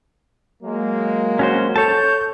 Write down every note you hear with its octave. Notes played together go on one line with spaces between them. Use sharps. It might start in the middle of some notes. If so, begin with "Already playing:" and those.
F#3 G#3 A#3
C#4 F#4 C5
A4 C#5 A5 G6